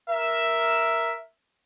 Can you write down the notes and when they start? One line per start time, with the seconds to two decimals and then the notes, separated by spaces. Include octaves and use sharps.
0.10 A#4 E5